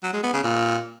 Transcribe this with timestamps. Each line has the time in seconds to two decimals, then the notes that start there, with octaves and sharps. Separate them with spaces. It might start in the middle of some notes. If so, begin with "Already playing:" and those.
0.04 F#3
0.14 G#3
0.24 B3
0.34 C#3
0.44 A#2